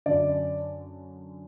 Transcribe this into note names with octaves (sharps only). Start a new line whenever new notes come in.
F#2 D3 D5